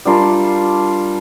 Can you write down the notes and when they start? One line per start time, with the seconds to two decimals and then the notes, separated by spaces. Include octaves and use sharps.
0.05 G3 D4 F4 A#4